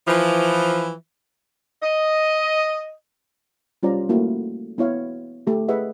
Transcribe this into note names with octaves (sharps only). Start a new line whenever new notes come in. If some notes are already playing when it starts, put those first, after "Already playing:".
E3 F3
D#5
G3 C#4 F4 C5 D5 A#5
A3 A#3 E4 F#4
B3 E4 C#5 F5
A3 G4
G#4 B4 D#5 E5 F#5